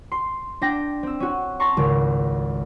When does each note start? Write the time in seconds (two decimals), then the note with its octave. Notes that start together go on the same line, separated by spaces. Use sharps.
0.12 C6
0.62 D4 G5 A#6
1.03 C4 E6
1.20 C#4 F#4
1.60 A5 A#5 C6 C#6
1.77 G#1 C#2 C#3